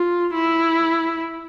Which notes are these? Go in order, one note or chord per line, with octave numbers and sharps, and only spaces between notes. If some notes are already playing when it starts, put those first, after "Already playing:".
Already playing: F4
E4